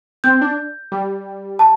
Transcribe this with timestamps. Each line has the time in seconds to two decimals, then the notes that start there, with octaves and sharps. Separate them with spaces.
0.24 C4 G6
0.41 D4
0.92 G3
1.59 A5